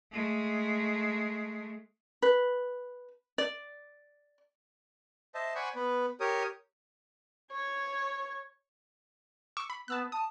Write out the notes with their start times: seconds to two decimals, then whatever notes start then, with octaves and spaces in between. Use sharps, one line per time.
0.12 G#3 A3
2.22 B4
3.38 D5
5.35 C5 D#5 E5 A5
5.55 C5 D5 F#5 G#5 B5 C#6
5.75 B3 B4
6.20 G4 A#4 C#5 D#6
7.52 C#5 G#6
9.57 C#6 D6 E6
9.70 B5
9.88 B3 A5 E6 F#6
10.12 A5 D#6